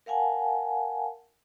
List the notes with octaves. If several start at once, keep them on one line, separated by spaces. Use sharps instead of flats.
A#4 F5 F#5 G#5 A5